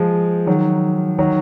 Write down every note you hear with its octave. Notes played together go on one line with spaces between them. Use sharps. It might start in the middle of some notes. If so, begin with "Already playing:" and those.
Already playing: F3 G#3
D#3 F#3
D#3 F#3